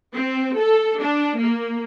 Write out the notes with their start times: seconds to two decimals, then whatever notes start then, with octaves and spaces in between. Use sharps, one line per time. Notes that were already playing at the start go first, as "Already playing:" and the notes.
0.15 C4
0.58 A4
1.02 D4
1.39 A#3